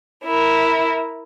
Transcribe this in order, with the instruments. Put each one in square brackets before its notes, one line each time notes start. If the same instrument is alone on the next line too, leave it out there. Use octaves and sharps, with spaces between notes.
[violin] E4 A#4